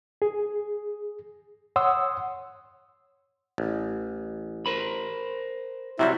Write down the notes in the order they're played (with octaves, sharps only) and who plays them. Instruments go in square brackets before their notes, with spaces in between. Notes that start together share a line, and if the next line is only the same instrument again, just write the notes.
[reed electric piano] G#4
C#5 F#5 C6 D#6 E6
[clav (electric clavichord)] A1
[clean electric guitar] A#4 C5 B5
[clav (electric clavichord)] C3 F#3 G3 [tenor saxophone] E4